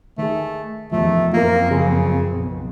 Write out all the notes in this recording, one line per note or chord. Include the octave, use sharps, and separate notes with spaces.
D#3 A3 G#4
E2 C3 D#3 F3 A3
F#2 A#3 C4 F4 A#4
C#3 F3 G#4
B1 B2